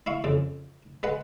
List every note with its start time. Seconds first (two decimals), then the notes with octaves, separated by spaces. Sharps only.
0.06 E4 F5 C#6
0.24 F2 C#3
1.03 G#3 B4 F#5